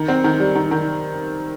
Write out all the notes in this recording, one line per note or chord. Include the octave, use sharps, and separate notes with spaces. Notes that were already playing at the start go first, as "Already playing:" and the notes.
Already playing: D#3
C4
D#3
G3
D#3
D#3